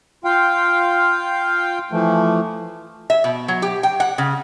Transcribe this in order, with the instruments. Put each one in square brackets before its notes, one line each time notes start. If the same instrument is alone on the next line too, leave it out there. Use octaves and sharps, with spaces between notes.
[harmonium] F4 F5 G5
E3 F3 A3
[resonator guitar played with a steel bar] E5
B2
F#3
G4
G5
F#5
C#3